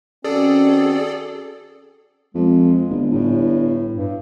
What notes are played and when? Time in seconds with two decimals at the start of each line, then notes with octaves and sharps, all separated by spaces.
0.24 D#3 C4 C#4 F#4 G#4 A4 D5
2.35 F2 G#3
2.90 G1
3.11 G1 A2
3.94 G2